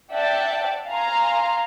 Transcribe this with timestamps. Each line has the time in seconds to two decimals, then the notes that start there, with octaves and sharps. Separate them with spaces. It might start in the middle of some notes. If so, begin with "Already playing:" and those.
0.11 D5 E5 F#5 G5 A5
0.87 F5 G#5 A#5 C6